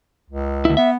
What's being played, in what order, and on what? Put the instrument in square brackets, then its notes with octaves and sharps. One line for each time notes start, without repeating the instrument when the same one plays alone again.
[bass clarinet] C#2
[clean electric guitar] D2 E4
[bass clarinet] B3 [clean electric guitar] E5